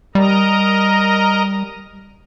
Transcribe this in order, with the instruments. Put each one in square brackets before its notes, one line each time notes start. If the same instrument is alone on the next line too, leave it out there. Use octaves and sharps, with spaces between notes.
[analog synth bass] G3 [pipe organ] A#4 D#5 A#5